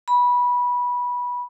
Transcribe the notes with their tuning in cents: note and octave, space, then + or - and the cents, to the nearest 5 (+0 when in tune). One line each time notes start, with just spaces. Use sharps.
B5 -15